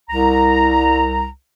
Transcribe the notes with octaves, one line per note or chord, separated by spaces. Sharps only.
C2 A#5